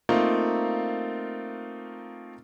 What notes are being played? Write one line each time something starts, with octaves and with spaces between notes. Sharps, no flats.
A3 A#3 C4 D#4 F4